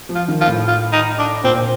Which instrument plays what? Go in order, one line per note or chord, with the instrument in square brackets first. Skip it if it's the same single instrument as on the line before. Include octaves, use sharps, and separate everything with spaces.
[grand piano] F3
[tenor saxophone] F4
[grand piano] D#3
[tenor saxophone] F4
[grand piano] A2
[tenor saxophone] F4
D#4
D4
[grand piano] A#2 [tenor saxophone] C4